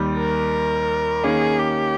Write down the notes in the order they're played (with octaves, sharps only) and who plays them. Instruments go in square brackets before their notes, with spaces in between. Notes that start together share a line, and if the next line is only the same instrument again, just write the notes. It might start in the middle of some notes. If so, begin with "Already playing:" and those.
Already playing: [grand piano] D#2 D#3 G3
[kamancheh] A#4
[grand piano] D#3 A#3 C#4 [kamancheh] G#4
[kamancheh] G4